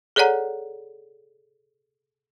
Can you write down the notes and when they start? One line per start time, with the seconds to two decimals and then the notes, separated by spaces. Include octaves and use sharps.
0.16 G#4 A4 C#5 D5 F#5 A#5